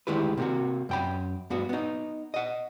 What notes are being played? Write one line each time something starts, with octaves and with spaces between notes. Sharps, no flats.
D2 D#3 G#3 E4 G4 B4
C3 A#3 F#4
F#2 G5 B5
G2 B3 F#4
B3 D#4
D#5 F#5